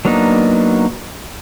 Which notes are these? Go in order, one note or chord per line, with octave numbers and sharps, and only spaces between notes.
F#3 A#3 B3 D4 D#4